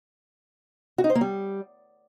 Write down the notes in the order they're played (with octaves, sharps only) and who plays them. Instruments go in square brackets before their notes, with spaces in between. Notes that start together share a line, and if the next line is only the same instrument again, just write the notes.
[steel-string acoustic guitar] F#4
D#4
C5
A#3
G3